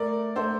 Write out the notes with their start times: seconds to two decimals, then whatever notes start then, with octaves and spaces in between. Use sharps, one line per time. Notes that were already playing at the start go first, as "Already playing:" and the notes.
Already playing: A3 A#4 D5
0.36 A3 A4 C5